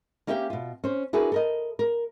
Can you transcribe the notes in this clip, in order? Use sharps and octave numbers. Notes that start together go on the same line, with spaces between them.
A#3 C#4 G4 E5 F#5 G5
B2 F4
C#4 C5
D4 E4 F#4 G#4 A#4 B4
A4 A#4 D#5
A#4